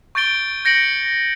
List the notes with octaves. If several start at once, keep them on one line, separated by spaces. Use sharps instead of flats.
C#6 G6 A6 D7 G7
G6 A#6 C#7 D7 F#7